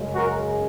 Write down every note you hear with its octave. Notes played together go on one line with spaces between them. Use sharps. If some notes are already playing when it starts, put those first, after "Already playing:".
Already playing: F#2 C#3 G#3
F#4 A#4